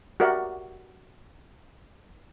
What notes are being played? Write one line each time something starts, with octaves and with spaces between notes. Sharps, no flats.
F#4 G4 A#4 D5 E5 F#5